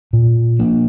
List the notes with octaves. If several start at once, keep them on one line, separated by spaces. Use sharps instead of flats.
A#2
F3 A#3 D4